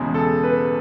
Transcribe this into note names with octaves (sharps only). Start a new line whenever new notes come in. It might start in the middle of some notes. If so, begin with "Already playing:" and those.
Already playing: E1 E2 C#3 G#3
A4
B4